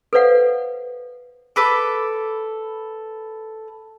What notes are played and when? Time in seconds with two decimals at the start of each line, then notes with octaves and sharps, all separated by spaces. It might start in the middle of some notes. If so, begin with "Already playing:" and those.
0.13 A4 B4 C5 D5 F5 F#5
1.56 A4 B4 D6